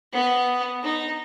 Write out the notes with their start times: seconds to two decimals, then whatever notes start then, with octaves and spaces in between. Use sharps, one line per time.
0.13 B3
0.83 D#4